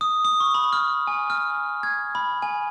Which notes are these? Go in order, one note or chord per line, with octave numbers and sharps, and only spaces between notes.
D#6
D#6
C#6
B5
F6
G#5
F6
G#6
B5
G#5